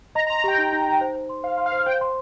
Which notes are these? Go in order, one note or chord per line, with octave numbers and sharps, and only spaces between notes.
D#5 A#5
A#5
C6
A#5
G4 G5
D#4
D#4
D#4
C5
C5
C6
C5 F5
C6
F5
C5
C5 G5
C6